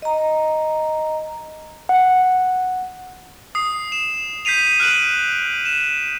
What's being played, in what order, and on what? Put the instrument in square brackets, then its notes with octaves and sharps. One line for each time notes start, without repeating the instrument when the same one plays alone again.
[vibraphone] D#5 A#5
[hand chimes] F#5
[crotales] D#6 C7
E7
G6 B6 C7 D#7 F7
F6 F#6 D7 F#7
E7